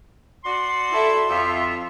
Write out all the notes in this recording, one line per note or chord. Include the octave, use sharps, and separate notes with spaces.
F#4 D5 C6
E4 A4 E5
F2 F4 E5